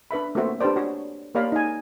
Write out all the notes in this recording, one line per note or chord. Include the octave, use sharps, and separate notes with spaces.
D4 B4 E5 B5
A3 A#3 C4 F#4 C5 E5
D4 G4 B4 C5 D5
F#4 C#5
A#3 G4 C#5 D5 F5 B5
D#4 G#5